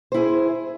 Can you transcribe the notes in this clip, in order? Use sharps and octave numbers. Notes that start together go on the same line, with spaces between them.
E4 G#4 C5